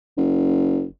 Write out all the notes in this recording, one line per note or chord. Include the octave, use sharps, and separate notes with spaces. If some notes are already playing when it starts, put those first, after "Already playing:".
F#1